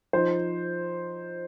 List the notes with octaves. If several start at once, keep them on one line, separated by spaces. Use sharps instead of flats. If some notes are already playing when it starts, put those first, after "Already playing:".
F3 D#4 C5